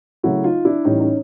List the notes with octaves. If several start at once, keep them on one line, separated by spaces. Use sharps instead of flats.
C#3 F#3 A3 E4 F#4
D#4 F4
D4 E4
A2 E3 G3 C#4 D#4
C#4 D#4